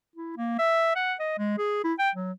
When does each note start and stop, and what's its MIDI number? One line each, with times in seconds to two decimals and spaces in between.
0.16 0.37 64
0.37 0.54 58
0.59 0.93 76
0.96 1.14 78
1.20 1.35 75
1.38 1.56 56
1.58 1.84 68
1.84 1.93 64
1.99 2.10 79
2.15 2.32 54